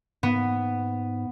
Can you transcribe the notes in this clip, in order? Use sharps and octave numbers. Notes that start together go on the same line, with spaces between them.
G#2 B3